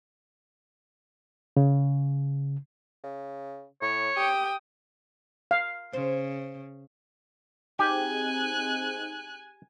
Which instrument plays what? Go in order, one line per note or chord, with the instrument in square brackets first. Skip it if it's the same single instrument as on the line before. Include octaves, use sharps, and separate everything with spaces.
[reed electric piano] C#3
[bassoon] C#3
[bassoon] A2 [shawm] C#5
[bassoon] G4 [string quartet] G5 D#6
[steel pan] F5
[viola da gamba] C#3 [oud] C5
[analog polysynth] C4 D#4 G#4 [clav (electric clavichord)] G4 [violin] G#5 F#6